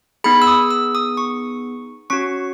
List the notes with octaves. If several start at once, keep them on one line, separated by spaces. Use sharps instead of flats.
B3 D#4 G#4 B5
E6
D#6
E6
D#6
C#6
C#4 F#4 C#6